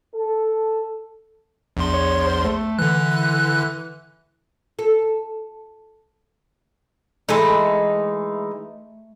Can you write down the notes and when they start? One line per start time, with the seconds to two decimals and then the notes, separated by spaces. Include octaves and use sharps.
0.14 A4
1.77 A#1 E2 C6
1.94 C#5
2.26 C5
2.45 A3
2.79 D3 E3 F#6
4.79 A4
7.29 E3 G#3 A3 D#4